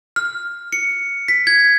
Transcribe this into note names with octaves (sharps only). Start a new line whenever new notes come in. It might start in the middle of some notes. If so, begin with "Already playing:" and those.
F6
C#7
B6
G#6